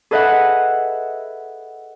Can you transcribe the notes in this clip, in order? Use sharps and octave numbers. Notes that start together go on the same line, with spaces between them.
G#4 A4 B4 D#5 E5 F#5